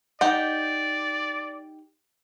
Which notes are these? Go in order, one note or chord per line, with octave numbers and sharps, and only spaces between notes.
D#4 G4 D5 F#5